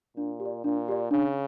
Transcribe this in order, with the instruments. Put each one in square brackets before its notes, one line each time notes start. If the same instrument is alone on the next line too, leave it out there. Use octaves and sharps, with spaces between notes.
[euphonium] A#2 [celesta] D4
[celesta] G4
D5
[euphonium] A#2 [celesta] D4
[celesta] G4 D5
[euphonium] C#3 [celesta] D4